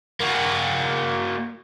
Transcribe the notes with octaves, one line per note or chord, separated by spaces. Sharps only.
A#3 F#4